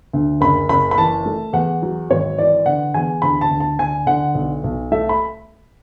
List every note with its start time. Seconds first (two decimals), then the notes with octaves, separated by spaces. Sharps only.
0.13 D2
0.41 F#1 B5
0.69 F#1 B5
0.91 B5
0.98 E3 A5
1.26 A3
1.53 E2 F#5
1.82 F#3
2.10 G#1 C#5
2.38 E3 D5
2.66 D3 F#5
2.94 E2 G#5
3.22 D2 B5
3.41 A5
3.50 D2
3.60 A5
3.78 D3 G#5
4.06 D3 F#5
4.35 B1
4.64 B1
4.92 A3 E5
5.09 B5